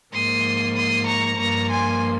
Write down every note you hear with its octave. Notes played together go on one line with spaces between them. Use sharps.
G#2 F3 A#3 C6 D#6
C6 D#6
A#5 C#6
G2 F3 A#3 A#5 C#6
G#5 C6